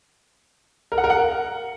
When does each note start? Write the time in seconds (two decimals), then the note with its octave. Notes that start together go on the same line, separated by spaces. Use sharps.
0.92 A#4
0.98 F#5
1.04 A#4
1.10 F#5